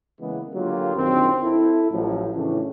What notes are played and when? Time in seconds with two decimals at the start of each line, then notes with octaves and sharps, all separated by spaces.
0.19 C#3 E3 G#3 A#3 B3
0.53 D3 F#3 A#3 F4 G4
0.95 A#1 F#2 D#3 C4
1.43 E4 A4
1.90 A1 A2 F3 F#3
2.35 A2 C#3 E3 C#4 D4